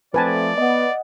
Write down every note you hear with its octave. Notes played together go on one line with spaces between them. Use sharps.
F3 A3 C4 B4 D5 G#5 A5
B3 D#5 F#5